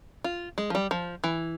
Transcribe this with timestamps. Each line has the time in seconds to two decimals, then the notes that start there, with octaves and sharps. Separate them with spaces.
0.24 F4
0.58 G#3
0.70 F3
0.75 G3
0.91 F3
1.24 E3